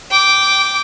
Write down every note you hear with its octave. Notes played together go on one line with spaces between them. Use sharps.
G5 D6